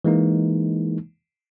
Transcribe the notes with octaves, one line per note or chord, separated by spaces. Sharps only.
E3 G#3 A#3 D#4